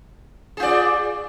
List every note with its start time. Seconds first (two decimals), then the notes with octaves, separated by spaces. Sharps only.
0.57 G#4
0.60 F4
0.63 D5